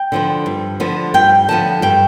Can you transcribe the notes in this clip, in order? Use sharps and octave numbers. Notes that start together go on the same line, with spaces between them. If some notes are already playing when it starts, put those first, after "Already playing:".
Already playing: G5
D3 F3 B3
G2
D3 F3 B3
G2 G5
D3 F3 B3 A5
G2 G5